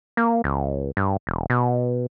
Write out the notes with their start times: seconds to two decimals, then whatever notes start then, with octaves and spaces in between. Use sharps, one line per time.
0.17 A#3
0.44 C#2
0.97 G2
1.27 E1
1.50 B2